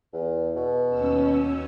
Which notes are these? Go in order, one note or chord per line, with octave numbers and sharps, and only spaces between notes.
E2
B2
D#2 C#4 E6